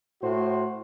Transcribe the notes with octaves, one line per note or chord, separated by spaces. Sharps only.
A2 F#4 C5